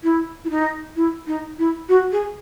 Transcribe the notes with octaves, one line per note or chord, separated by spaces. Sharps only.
E4
E4
D#4
E4
D#4
E4
F#4
G#4